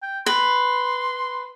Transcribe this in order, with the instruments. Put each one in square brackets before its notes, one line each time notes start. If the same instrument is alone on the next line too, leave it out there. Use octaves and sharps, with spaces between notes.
[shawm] G5
[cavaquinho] B4 [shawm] C6